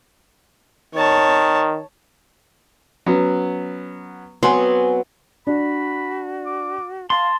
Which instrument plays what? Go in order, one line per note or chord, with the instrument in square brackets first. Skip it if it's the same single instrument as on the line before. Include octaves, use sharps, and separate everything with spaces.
[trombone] D#3 [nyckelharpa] C#5 A5
[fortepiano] F#3 B3 C#4
[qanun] F#3 B3 C4 [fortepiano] G#5 C6
[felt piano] D4 [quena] F#4 [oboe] B5
[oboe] D6
[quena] F5 [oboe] A5 [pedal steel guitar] C6